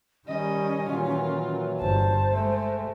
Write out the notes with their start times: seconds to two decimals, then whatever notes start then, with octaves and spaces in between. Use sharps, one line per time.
0.28 D#3 G3 C#4 D#5
0.90 A#2 D#3 E3 F#3 F4
1.80 G1 C5 A5
2.34 G#3 A3